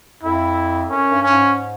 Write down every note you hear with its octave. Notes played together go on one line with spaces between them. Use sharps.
F2 E4
F#2 C#4
G2
C#4
G#2